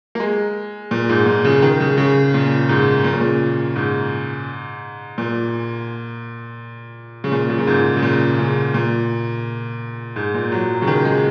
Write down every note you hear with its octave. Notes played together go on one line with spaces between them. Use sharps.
A#3
G#3
A#2
G#2
A#2
C#3
D#3
C#3
C#3
A#2
G#2
A#2
C#3
A#2
G#2
A#2
C#3
A#2
C#3
A#2
G#2
C#3
A#2
C#3
A#2
G#2
A#2
F#3
C#3
D#3
G#3